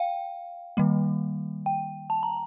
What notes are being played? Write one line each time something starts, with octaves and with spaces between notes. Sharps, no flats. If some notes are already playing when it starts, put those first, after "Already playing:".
Already playing: F5 G5
D#3 G3 A#3
G5
A5
A#5